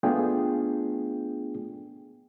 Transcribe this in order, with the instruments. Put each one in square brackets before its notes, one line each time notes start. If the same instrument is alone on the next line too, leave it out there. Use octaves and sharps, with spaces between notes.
[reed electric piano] A3 B3 D4 F4 G#4 G5